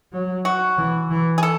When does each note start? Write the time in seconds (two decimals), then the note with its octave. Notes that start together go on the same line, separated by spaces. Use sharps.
0.12 F#3
0.45 F#4
0.78 E3
1.10 E3
1.38 G#4
1.43 A4